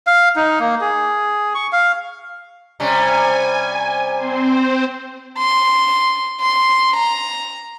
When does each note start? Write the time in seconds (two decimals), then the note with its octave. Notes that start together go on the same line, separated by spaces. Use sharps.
0.07 F5
0.36 D#4
0.60 A#3
0.81 G#4
1.55 C#6
1.73 F5
2.80 C3 G3 C#4 G#5
4.18 C4 C5
5.39 C6
6.41 C6
6.96 A#5